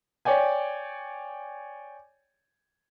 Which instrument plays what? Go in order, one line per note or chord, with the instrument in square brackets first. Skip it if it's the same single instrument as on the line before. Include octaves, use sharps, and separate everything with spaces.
[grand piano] C#5 D5 G5 G#5